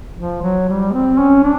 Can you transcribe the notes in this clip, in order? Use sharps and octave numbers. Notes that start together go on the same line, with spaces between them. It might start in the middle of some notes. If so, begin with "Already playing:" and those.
F3
F#3
G3
C4
C#4
D4